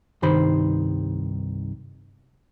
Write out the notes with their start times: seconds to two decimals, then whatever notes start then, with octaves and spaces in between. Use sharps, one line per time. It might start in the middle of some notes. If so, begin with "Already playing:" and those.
0.22 C2 G2 D#3 C5 B5